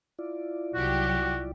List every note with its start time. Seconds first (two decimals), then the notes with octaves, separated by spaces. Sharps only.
0.19 E4 F4 D5
0.75 C2 F#3 F#4 G4